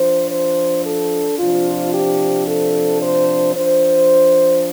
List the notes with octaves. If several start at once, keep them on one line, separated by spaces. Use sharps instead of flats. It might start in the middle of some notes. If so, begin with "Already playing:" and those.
Already playing: F3 D4 C5
C5
A4
C3 F3 D4 F4
G4
A4
C5
F3 D4 C5